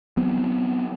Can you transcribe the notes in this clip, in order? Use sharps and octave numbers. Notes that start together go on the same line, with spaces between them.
F#3 B3 C4